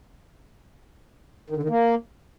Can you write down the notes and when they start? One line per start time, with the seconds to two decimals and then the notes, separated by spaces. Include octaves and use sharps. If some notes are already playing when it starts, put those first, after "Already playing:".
1.50 D#3
1.57 D3
1.63 D#3
1.69 A#3